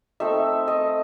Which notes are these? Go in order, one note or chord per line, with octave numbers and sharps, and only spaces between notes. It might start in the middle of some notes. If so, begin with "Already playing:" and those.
A3 C4 D#4 E5
D#5